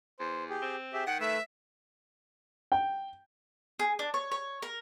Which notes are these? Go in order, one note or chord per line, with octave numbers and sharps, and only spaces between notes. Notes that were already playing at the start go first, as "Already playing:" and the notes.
E2 C5
G4 G#4
C4
G4 G#4 E5
D#3 F#5 G5
A3 B4 E5 E6
G5
G#4
D4
C#5
C#5
A#4